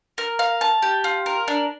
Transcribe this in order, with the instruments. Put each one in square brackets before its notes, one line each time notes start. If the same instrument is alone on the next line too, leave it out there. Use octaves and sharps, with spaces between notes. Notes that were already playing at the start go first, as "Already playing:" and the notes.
[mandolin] A#4
F5
A5
G4
F4
A#4
D4